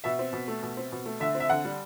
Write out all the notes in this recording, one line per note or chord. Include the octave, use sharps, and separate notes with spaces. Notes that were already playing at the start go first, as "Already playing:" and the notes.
B2 E5
C4
B2
A3
B2
C4
B2
A3
D3 E5
C4
E5
D3 F#5
G3